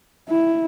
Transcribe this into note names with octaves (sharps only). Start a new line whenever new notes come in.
E4